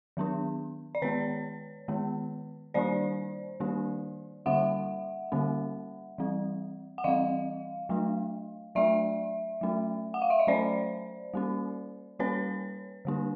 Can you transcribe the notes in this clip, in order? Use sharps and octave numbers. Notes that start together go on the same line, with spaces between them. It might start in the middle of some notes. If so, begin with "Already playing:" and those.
D#3 F#3 B3 D4
D5
D#3 G#3 B3 B4 C#5
D#3 G#3 B3
D#3 G3 A#3 D4 C5 D5
D#3 G3 A#3 D4
D3 G3 A#3 C#4 E5 F#5
D3 G3 A#3 C#4
E3 G3 C4
F#5
E3 G3 C4 D#5 F5
F#3 A3 D4
F#3 A3 D4 D5 E5
F#3 A3 C#4
F#5
F5
E5
D#5
F#3 A3 C#4 C5 D5
G3 A#3 C#4
G3 A#3 C#4 B4 C#5
D3 G3 A#3 D4